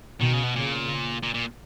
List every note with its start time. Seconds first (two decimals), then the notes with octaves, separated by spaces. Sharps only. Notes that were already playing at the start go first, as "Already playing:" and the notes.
0.21 B2 D#3
0.33 C#3
0.44 B2
0.55 A#2 C#3
1.23 A#2
1.34 A#2